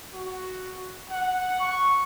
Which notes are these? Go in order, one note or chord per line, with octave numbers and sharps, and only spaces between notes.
F#4
F#5
C#6